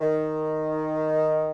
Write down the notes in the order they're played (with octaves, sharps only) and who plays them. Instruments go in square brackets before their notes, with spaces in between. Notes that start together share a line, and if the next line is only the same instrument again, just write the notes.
[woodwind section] D#3